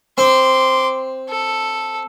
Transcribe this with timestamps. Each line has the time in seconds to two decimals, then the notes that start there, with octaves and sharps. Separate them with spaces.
0.18 C4 C6 D6
1.29 A4